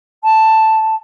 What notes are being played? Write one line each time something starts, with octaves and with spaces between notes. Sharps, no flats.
A5